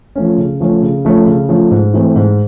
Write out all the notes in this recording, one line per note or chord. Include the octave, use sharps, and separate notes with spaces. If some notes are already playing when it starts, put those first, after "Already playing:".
F3 A3 C#4
C#3
F3 A3 C#4
C#3
F3 A3 C#4
C#3
F3 A3 C#4
G#2
E3 A3 C4
G#2